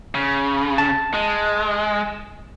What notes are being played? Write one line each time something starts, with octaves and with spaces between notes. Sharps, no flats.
C#3
A5
G#3